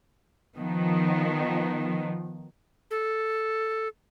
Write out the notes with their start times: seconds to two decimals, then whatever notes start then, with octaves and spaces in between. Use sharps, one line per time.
0.58 D#3 F3 B3
2.91 A4